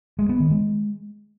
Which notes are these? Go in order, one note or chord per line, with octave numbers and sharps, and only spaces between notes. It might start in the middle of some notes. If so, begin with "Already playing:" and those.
G#3
B3
D#3
G#3